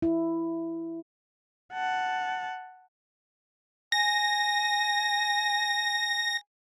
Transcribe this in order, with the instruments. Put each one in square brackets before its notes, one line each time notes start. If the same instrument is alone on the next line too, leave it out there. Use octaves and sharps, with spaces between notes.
[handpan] E4
[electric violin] F#5 A5
[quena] G#5 [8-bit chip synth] A#6